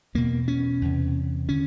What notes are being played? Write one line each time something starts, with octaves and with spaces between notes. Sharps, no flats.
E2 B2 A#3
C#4
E2 C3
D3 C#4